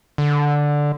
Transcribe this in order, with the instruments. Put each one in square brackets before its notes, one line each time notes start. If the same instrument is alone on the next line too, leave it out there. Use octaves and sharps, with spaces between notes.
[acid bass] D3